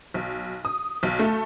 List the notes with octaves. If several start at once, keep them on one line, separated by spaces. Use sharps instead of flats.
B1
D#6
B1
A3